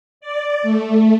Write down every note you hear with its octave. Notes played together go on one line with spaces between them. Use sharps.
D5
A3